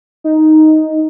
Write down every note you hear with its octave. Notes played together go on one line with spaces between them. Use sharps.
D#4